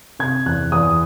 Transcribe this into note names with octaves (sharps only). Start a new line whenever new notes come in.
C3 G#6
E2 F#6
E2 D#6